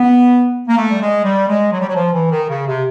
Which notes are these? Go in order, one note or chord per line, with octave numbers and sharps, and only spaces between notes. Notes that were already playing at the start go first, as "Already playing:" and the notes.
Already playing: B3
A#3
A3
G3
G#3
G3
G#3
F#3
G3
F#3
F3
E3
D#3
C#3
C3